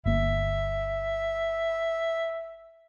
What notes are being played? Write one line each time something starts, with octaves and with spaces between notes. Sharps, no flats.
G1 A#3 E5